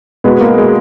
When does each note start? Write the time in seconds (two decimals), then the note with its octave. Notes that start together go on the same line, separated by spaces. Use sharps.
0.24 B2 G#3 B3
0.41 A#3
0.58 G#3